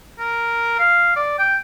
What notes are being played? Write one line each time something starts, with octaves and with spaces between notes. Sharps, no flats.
A#4
F5
D5
G5